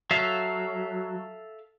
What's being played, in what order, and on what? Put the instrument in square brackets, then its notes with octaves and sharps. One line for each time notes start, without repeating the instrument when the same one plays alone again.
[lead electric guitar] F#3 [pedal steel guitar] A4 E5 F5